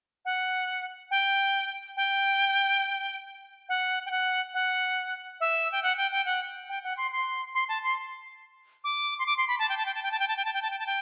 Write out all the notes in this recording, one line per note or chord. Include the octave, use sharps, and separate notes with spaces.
F#5
G5
G5
F#5
G5
F#5
F#5
E5
G5
F#5
G5
G5
F#5
G5
F#5
C6
C6
C6
A5
C6
D6
C6
D6
C6
B5
A5
G5
A5
G5
A5
G5
A5
G5
A5
G5
A5
G5
A5
G5
A5
G5